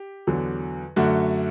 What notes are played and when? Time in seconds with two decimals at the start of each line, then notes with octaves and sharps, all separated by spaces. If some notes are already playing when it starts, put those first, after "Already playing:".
Already playing: G4
0.27 E2 D3 F#3
0.96 F#2 D3 A3 F#4